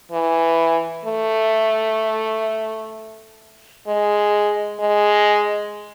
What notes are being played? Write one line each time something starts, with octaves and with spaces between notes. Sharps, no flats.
E3
A3
G#3
G#3